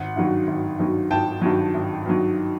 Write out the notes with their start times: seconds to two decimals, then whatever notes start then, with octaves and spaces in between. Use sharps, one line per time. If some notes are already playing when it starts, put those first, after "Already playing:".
Already playing: G#1 F#5
0.16 G2 D#3 F#3
0.47 G#1
0.79 G2 D#3 F#3
1.11 G#1 G5 A5
1.41 G2 D#3 F#3
1.74 G#1
2.05 G2 D#3 F#3